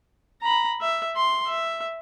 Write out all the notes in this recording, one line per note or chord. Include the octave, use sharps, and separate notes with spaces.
A#5 B5
E5
C6
E5